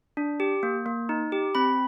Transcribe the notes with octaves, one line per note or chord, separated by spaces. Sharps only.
D4
G4
A#3
A#3
D#4
G4
C4 B5